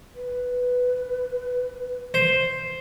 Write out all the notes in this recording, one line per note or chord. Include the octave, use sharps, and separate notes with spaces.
B4
C5